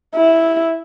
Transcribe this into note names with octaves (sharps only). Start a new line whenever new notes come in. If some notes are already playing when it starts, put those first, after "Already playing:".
E4